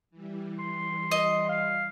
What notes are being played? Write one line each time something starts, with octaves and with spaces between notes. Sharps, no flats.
E3 G3
C6
D#5
F5